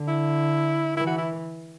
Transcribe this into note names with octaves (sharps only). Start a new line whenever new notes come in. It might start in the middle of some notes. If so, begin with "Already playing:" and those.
Already playing: D3
E4
E3 E4
F#4
E4